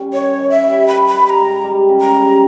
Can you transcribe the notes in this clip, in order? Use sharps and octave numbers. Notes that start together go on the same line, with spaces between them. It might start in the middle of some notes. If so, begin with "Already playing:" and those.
Already playing: G3 C#4
D#3 C#5
D#3
E5
G3
D#3 B5
B5
G3
B5
A#5
G#2
G3
C#3
A#5
G3